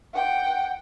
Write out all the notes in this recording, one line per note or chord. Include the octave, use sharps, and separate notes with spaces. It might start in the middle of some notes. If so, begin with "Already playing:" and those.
F#5 G5